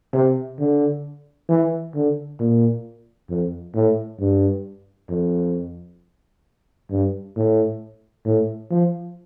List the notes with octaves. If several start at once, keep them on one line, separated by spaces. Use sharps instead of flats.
C3
D3
E3
D3
A#2
F2
A2
G2
F2
G2
A2
A2
F3